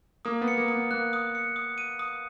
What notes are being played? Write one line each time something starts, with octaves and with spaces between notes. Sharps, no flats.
A#3 D#6
B3
C#7
A#3
D#6
B3
A#3 F#6
D#6
C#7
D#6
D#7
D#6